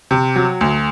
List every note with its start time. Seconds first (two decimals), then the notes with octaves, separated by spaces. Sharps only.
0.11 C3
0.36 F#3
0.61 D2